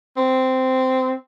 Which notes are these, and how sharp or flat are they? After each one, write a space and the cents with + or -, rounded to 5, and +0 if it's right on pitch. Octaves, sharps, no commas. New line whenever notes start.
C4 -10